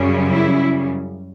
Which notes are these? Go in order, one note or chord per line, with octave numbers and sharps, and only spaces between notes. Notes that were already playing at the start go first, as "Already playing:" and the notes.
Already playing: F#2 C#3 G3 C#4
E4